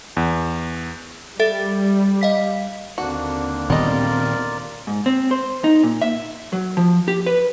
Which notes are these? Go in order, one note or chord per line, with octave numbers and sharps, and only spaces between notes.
E2
G3 A4 E5 A6
D#5 F5 B6
D#2 D3 A#3 C4 D4 F#4
A#2 D#3 G3 B3 F4 A#4 D5 D#5
G#2
C4
C5
D#4
A#2
E5
F#3
F3
G4
B4